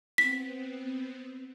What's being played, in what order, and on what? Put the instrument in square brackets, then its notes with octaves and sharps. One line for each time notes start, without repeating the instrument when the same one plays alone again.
[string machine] B3 C4 [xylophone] B6